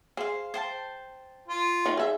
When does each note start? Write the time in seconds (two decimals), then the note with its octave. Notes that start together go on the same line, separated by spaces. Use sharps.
0.17 G#4 C5 F5
0.54 C5 G5 A5
1.48 F4
1.86 D#3 A3 D#4
1.97 G#4 E5